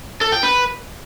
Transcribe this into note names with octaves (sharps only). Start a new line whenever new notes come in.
A4
G5
B4